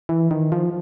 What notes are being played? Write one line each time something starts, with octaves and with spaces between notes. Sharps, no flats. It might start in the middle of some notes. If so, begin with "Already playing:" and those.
E3
D#3
F3